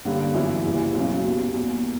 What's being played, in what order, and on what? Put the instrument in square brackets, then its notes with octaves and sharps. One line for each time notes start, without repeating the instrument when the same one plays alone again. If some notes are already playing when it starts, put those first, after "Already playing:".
[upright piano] G2 D3 A#3 C#4 G4
F#2 E3 B3 E4
F#1 E2 C#3 E3 G3
B1 B2 F#3 C#4
B2 G3 A#3
E2 B2 A#3